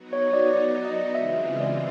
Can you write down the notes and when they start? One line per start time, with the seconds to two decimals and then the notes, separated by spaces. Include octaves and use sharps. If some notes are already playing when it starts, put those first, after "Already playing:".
Already playing: F#3 B3 D#4 F#4
0.13 C#5
0.33 D5
0.53 D5
0.85 D#5
1.15 C#3 E3 G#3 C4 F4 E5
1.30 E5
1.46 D#5
1.60 D5